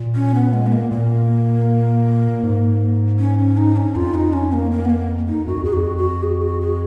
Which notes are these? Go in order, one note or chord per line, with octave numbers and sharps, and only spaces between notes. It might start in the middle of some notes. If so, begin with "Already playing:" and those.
Already playing: A#2
C#4
B3
G#3
B3
A#3
A#2 A#3
G#2
C#4
C#4
D#4
C#4
F2 F4
D#4
C#4
A#3
A#3
B3
A#3
D#4
F#2 F#4
F2
G#4
F2 F#4
F#4
G#4
F#4
G#4